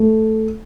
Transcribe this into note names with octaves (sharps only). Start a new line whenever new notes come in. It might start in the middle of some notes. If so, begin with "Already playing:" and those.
Already playing: A3